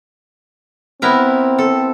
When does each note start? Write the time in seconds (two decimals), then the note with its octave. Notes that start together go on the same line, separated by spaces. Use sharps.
1.02 B3 C4 E4 A#4
1.59 A4